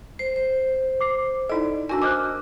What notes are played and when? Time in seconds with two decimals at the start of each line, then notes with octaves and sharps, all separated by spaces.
0.19 C5 C7
0.36 C5
1.01 D6 C7
1.49 D#4 E4 A4 D5 D#5
1.89 D4 F#4 A#4 G#5 E6
2.02 C5 D#5 G#5 D6 F6 F#6